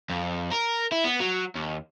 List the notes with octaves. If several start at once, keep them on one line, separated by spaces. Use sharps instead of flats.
F2
A#4
E4
B3
F#3
D#2